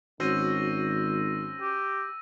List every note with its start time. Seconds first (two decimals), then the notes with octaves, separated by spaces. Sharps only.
0.20 G#1 C#4 F#4 C5 E6 A#6 D#7
1.61 G4